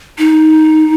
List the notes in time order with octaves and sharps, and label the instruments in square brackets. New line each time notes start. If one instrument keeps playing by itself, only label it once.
[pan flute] D#4